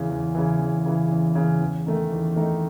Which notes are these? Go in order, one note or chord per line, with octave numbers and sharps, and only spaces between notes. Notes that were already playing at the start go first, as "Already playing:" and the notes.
Already playing: E2 C#3 E3
E2
C#3 E3
E2
C#3 E3
E2
C#3 E3
E2
D#3 A3 D#4
E2
D#3 A3 D#4